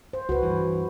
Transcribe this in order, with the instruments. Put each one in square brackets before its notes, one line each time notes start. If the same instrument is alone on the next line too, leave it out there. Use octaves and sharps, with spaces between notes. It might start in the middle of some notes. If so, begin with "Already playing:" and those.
[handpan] C5
[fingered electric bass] C#2 [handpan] F#4 B4
[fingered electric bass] G2 E3